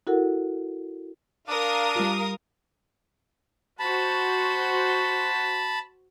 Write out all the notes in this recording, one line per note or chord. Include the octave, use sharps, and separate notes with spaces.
E4 F#4 A4 A#4 F#5
D4 A#4 F5 D#6
G3 F4
F#4 C5 A5 B5